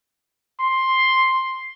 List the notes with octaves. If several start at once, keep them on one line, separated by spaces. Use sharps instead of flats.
C6